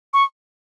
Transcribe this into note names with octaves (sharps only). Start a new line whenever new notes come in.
C#6